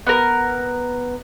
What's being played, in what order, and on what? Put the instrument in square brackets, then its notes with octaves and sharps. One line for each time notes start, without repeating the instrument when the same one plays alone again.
[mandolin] B3 A#4